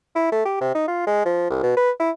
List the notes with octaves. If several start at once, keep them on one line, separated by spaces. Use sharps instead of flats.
E4
A3
G4
C3
D#4
F4
G#3
F3
C2
B2
B4
E4